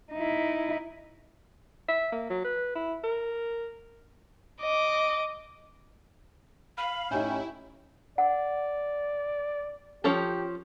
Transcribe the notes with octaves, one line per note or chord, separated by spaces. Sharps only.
D#4 E4
E5
A#3
F#3
B4
E4
A#4
D#5 D6
F5 B5
A2 C#4 D#4 E4 G4 G#5 G6
D5 F#5
F3 C#4 G4 A4